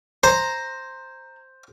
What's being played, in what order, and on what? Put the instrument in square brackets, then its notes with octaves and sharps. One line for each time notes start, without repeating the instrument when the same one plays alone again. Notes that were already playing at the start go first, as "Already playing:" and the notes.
[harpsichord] C5 [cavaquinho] A#5